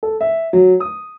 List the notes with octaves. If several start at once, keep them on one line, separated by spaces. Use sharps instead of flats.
A4
E5
F#3
D#6